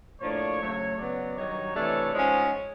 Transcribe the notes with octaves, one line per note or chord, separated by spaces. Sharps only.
A2 F3 A#3 D4 C#5
C#3 F#3 A3
C#3 F#3 B3 D5
G2 D#3 F#3 C#5
C3 E3 A3 D4
G#2 F3 G#3 C#4